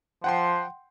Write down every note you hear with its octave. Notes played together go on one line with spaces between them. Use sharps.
F3 F#5 G5 C6